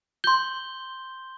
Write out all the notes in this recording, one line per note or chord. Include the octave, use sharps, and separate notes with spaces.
C6 G6 G7